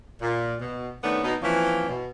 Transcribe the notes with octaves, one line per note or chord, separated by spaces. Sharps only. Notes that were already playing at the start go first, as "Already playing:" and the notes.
A#2
B2
D#3 A3 B3 C#4 D4
B2 D#4
E3 F3 A#3 C4 C#4
B2